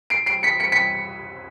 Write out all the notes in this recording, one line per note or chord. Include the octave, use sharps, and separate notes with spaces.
C7 D7
C7 D7
B6 C#7
B6 C#7
B6 C#7